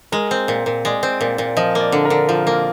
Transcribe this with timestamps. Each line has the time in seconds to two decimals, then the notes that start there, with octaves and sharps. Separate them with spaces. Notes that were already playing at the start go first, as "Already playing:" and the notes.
0.12 G#3 A#4
0.31 C4
0.48 A#2
0.66 A#2
0.85 G#3 D5
1.03 C4
1.20 A#2 D5
1.38 A#2
1.57 F3 D#5
1.75 A#3
1.80 D5
1.92 D3
2.05 A#4
2.10 D3
2.28 F3 F4
2.47 A#3